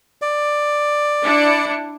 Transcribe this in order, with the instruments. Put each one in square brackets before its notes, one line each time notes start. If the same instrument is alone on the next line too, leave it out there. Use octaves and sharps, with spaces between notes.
[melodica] D5
[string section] D4 E4 C#7